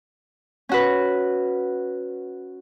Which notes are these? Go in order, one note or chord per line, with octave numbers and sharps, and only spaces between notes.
C#4 F#4 B4